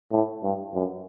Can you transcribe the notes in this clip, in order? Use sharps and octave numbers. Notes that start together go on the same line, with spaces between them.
A2
G2
F#2